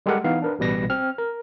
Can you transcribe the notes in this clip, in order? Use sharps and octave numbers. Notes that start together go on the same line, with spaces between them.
G3 G#3 G4 A4 A#4 F#5
E3 B3 D#4 F5
D4 A#4 B4
A1 B2 G3 B4 A#6
C4 F6
A#4